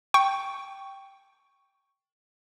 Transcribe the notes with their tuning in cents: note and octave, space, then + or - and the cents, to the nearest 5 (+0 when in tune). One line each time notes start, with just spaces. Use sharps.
G5 +0 C#6 +5